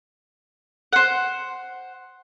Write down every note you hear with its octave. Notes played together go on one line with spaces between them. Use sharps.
C5 F#5